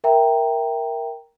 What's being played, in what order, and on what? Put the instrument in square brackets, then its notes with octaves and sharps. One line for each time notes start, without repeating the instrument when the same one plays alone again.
[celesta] A#4 E5 G5 A#5